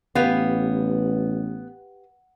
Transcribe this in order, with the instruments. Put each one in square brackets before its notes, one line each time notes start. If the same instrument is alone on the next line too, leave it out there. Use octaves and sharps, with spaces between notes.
[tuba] A1 [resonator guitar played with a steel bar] B3 [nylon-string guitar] G4 B4 F5